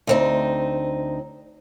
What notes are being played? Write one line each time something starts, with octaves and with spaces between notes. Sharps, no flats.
D2 C4 D#4